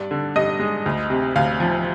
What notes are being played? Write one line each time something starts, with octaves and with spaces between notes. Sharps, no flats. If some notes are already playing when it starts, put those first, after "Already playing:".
Already playing: G2 D5
D3
G2 D#5
G#3
D2
C3
D2 F5
F3